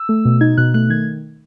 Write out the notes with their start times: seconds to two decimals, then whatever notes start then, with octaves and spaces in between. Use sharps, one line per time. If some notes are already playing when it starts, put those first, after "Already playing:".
Already playing: E6
0.09 A3
0.25 B2
0.41 D#4 G#6
0.58 B2 F#6
0.74 A3 F#6
0.89 D#3 G#6